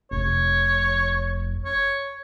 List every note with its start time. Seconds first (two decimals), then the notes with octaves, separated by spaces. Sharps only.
0.11 F1 C#5
1.65 C#5